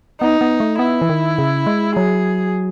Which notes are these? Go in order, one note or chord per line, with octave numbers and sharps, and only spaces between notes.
B3 D#4
B3
A3
B3 E4
E3
D#3
C#3
G#3
F#3 G#4